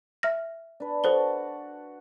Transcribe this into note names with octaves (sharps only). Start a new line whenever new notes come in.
E5 F6 A#6
D4 B4
F#4 A4 C5 F#5 A5 G7